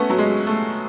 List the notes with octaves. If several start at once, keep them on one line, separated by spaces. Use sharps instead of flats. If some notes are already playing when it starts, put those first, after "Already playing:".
Already playing: A3 B3 C#4
F#3
G#3
A3